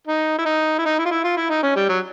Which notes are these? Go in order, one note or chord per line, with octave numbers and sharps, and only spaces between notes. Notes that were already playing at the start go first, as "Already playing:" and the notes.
D#4
E4
D#4
E4
D#4
E4
F4
E4
F4
E4
D#4
C#4
G3
F#3